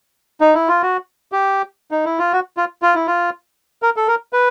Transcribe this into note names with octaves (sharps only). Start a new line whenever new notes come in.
D#4
E4
F4
F#4
G4
D#4
E4
F4
F#4
F4
F4
E4
F4
A#4
A4
A#4
B4